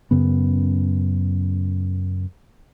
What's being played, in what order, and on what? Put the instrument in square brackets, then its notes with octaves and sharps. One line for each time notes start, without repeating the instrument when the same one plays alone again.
[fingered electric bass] F#2 C#3 B3